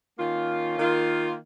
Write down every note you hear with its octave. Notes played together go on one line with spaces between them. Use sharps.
D#3 A#3 C#4 F4
D#3 A#3 F4